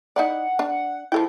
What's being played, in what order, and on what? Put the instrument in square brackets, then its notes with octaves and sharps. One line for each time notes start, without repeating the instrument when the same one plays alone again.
[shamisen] D#4 E4 D5 [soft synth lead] F#5
[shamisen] D4
[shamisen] F3 A4 G5 [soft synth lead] E4